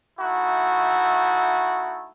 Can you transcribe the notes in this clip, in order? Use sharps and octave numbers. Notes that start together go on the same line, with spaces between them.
A3 D#4 E4 F#4